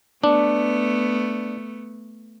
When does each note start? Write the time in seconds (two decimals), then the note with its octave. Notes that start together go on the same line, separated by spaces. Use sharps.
0.24 A3 B3 D4